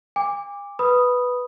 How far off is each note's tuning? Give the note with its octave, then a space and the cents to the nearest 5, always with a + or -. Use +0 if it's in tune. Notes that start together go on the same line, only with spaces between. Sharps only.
G#5 -45 D6 +0
B4 +0 B5 -5 D#6 +0